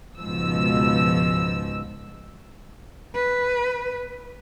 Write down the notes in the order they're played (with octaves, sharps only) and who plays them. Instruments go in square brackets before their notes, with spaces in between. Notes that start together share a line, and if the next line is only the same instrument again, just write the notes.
[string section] C#2 G#2 B2 F3 E6
[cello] B4